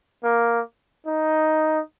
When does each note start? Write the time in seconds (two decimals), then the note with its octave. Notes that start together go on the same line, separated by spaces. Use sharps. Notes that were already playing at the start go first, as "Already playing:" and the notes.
0.24 A#3
1.07 D#4